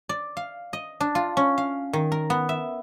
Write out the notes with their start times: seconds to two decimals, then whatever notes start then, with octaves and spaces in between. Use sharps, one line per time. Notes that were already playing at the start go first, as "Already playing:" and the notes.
0.09 D5
0.37 F5
0.73 D#5
1.00 D4
1.15 F4
1.37 C#4
1.58 F5
1.93 D#3
2.12 A#4
2.30 B3
2.49 E5